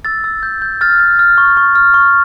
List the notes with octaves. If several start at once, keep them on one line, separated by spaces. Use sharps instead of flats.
E6 A6
E6
G6
G6
F6 A6
F6
F6
C#6
C#6
F6
C#6